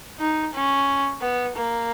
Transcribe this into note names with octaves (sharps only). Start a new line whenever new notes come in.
D#4
C#4
B3
A#3